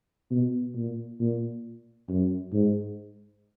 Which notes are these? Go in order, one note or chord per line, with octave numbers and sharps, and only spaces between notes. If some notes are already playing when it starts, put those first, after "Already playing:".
B2
A#2
A#2
F#2
G#2